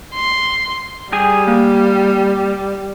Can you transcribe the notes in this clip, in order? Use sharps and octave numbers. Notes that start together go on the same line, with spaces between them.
C6
G3 G4 G#4 G#5
A#3